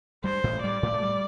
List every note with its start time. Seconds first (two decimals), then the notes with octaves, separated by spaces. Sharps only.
0.24 G2 G3 C5
0.44 A1 A2
0.63 G2 G3 D5
0.83 A2 A3
0.94 A3
1.02 G3